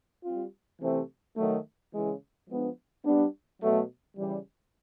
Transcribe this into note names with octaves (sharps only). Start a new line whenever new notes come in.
G3 C4 F4
C3 E3 A3 C4
D#3 F#3 A3
C#3 E3 G#3
F3 G#3 B3 D4
G3 B3 D4
B2 F#3 A3
C#3 E3 G3